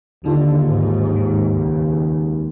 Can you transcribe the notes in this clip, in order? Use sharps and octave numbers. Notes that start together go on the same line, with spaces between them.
D#2 D3 F#3 D#4 F4
G#2
D#3
C#2